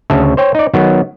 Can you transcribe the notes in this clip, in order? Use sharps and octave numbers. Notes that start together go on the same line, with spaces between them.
D2 C#3 E5 A5
C5 C#5 G5
D#4 D5
D#3 F#3 B3